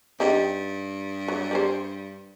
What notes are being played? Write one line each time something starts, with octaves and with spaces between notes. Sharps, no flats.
G2 D#4 G4 G5
F#3
G3 B4 C5